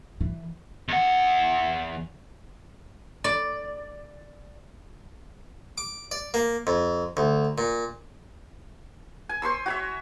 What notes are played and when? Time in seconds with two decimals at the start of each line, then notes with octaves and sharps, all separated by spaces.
0.21 E3
0.88 E2 F#5
3.24 D5
5.78 D6
6.11 D5
6.34 A#3
6.67 F2
7.17 D2
7.58 A#2
9.29 G#5
9.42 C5 C6 C#6 E6
9.66 F#4 C#5 E5